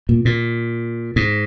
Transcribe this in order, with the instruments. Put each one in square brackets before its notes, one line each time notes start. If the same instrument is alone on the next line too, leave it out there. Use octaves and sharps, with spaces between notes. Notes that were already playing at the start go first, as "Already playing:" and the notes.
[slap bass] A#2
A#2
G#2